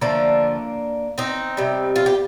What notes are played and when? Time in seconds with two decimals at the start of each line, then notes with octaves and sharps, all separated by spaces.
0.01 D3 F3 A3 A#3 D4
1.18 C4 D#4
1.57 C3 G3
1.96 F4
2.06 G4